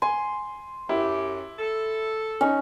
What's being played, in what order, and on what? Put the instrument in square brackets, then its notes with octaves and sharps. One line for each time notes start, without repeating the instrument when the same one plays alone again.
[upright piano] G#5 [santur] C6
[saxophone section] F#2 G4 [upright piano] E4
[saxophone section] A4
[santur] C#4 [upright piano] D#4